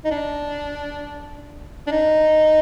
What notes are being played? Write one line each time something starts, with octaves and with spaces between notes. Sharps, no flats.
D#4
D4
D4
D#4